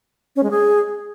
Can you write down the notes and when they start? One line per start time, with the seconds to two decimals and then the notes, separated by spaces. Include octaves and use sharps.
0.36 C#4
0.43 G#3
0.51 G#4